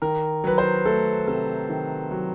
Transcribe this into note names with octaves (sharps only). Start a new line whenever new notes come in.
D#3 A#4
F#3 B4
C5
A3 A4
C3 A4
D#3
F#3